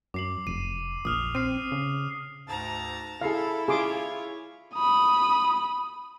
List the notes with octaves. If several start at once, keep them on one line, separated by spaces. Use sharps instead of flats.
F#2 D6 C7 F#7
F1 D#7
A#1 D#6 F6 F7
C4 F6 C7 D#7
C#3
D2 G#2 A5 A#5
E4 G#4 A4 F5
F4 G#4 C#5 C6 D6
B5 D#6